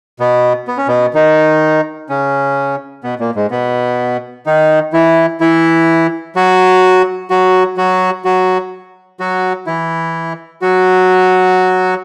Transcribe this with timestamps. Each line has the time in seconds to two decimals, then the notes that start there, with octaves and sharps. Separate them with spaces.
0.20 B2 B3
0.68 B3
0.77 C#4
0.88 B2 B3
1.14 D#3 D#4
2.09 C#3 C#4
3.04 B2 B3
3.19 A#2 A#3
3.35 G#2 G#3
3.51 B2 B3
4.46 D#3 D#4
4.93 E3 E4
5.41 E3 E4
6.35 F#3 F#4
7.30 F#3 F#4
7.77 F#3 F#4
8.24 F#3 F#4
9.20 F#3 F#4
9.67 E3 E4
10.62 F#3 F#4